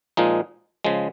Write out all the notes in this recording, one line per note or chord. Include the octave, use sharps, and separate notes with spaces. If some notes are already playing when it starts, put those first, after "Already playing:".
A#2 F3 G#3 D#4
C#3 F3 G#3